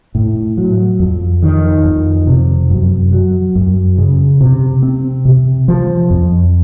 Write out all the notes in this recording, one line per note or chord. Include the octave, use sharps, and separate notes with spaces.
A2
F#3
F2
D#3
F2
C3
F#2
F#3
F#2
C#3
C3
C4
C3
F3
F2